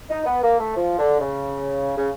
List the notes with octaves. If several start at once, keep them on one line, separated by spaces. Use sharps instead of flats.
D#4
B3
A#3
A3
F3
D3
C#3
C#3